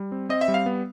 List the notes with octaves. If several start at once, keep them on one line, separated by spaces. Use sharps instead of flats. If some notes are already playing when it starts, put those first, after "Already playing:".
Already playing: G3
C4
C4 D#5
E5
G3
F5
B3